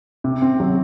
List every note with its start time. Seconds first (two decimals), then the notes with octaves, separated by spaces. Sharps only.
0.24 C3
0.42 C4
0.60 F#3